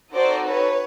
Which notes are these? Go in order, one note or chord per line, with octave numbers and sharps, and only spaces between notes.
C4 D#4 F#4 A4 C5 D5
B4 C#5